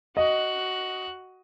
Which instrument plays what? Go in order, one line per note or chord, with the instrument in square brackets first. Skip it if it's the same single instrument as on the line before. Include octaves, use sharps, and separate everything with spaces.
[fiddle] F#4 F#6 [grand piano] D#5